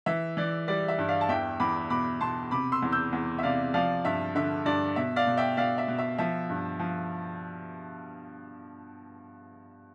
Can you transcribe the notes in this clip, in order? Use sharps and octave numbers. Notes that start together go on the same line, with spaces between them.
E3 E5
E3 D5
G3 D5
E5
G2
D5 F5
A5
E2 E5 G5
E2 B5 D6
B2 B5 D6
B2 A5 C6
C3 B5 D6
C6 E6
E2
E6 G6
E2
E5
C3 D5 F5
F3 D5 F5
G2 E5
D3 E5
G2 D5
B2 E5
D5 F5
B2
E5 G5
B2 D5 F5
E5
B2
E5
F3 E5
G2
F3